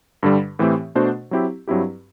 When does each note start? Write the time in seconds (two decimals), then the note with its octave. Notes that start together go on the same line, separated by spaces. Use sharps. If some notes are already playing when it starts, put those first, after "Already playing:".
0.23 G2 D3 G3
0.59 A2 E3 A3 C4 G4
0.95 B2 A3 D4 F#4 C5
1.31 F#3 C4 E4 G4
1.67 G2 F#3 C4 E4 G4